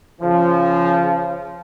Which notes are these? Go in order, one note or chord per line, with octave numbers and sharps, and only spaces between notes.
C#3 F3